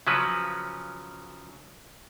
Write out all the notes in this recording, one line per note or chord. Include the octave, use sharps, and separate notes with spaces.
C#3 F3 F#3 C#4 B4